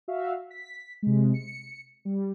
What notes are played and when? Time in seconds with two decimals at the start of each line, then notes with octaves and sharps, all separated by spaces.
0.08 F#4 E5 F5
0.51 B6
1.02 C3 G#3
1.34 C#7
2.05 G3